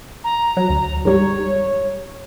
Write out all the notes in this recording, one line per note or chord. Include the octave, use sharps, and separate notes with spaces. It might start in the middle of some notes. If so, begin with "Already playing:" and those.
A#5
F#3
D2
G#2 G3 C#5